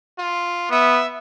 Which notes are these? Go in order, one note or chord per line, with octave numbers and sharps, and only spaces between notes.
F4
B3 E5